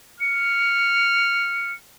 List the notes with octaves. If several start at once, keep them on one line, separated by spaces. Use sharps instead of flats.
F6 C#7